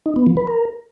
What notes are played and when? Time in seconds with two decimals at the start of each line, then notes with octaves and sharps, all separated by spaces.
0.06 D#4
0.16 B3
0.27 F3
0.37 B4
0.47 A#4